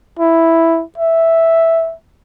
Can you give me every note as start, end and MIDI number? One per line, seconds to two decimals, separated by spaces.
0.19 0.82 64
0.98 1.94 76